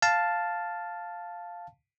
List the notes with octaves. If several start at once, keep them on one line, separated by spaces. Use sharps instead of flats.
F5 A5